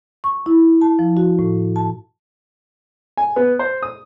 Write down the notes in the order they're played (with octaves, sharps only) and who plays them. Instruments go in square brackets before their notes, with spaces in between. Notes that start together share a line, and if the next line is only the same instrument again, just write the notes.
[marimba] C#6
E4
A5
F3
F#4
A2
A5
[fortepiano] G#5
B3
C5
D#6